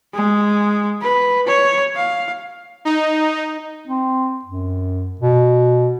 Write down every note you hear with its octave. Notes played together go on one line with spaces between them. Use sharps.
G#3
B4
C#5
F5
D#4
C4
F#2
B2